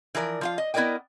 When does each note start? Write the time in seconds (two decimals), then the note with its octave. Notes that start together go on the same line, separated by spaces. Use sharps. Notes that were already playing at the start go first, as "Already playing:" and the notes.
0.15 E3 F3 A#4 D5
0.41 F3 F4 F5
0.58 D#5
0.74 B3 E4 A#4 D5 D#5 G5